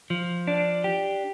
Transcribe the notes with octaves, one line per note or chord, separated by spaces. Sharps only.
F3
D4
G4